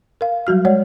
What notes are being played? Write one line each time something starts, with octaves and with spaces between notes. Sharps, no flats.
A#4 F5
F#3 G3 F#4 F6
G#3 C#5 D5 F#5